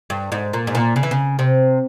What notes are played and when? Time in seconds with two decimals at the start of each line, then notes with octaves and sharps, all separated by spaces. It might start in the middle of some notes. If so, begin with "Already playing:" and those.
0.10 G2
0.32 G#2
0.53 A#2
0.67 G#2
0.75 A#2
0.96 C#3
1.03 E3
1.11 C#3
1.39 C3